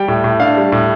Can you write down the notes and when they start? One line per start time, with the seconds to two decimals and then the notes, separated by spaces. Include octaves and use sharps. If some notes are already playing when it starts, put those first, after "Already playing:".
Already playing: G3 G5
0.08 A2
0.24 A2
0.40 D4 F5
0.57 G3
0.72 A2